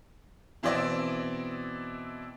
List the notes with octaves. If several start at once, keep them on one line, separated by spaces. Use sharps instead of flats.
B2 E3 C4 E4 D5 D#5